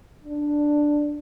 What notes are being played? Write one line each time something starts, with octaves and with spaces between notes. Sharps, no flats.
D4